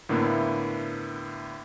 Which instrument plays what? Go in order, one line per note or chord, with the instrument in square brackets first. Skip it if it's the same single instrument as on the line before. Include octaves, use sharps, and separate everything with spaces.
[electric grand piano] A2 D3 A#3 B3 E4